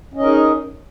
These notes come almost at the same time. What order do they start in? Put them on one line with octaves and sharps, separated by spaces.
C#4 D#5 A#4 D#4 G#4